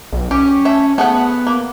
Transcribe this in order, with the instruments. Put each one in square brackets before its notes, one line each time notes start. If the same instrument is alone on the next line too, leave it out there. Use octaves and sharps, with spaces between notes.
[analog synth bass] B1
[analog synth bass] C#4 [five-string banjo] G4
[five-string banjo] A3 C#5 E5
[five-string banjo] A3 G#4 F#5 [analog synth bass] B3
[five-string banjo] A#3